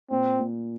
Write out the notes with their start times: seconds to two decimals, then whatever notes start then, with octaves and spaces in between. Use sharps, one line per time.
0.11 A#2 C4
0.39 A#2